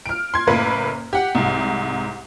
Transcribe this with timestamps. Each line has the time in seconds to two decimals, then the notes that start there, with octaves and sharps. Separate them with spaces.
0.06 F6 D7
0.34 C6 G#6
0.47 F#1 A2 A#3 B4
1.13 G4 F#5
1.35 C2 G#2